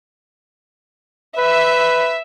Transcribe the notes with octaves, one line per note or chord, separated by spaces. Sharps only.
B4 E5